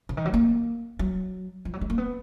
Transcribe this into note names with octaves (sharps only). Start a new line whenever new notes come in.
C#3
D#3
F#3
A#3
F#3
F3
F#3
G#3
A#3
B3